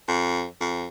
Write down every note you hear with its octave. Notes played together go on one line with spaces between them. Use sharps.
F2
F2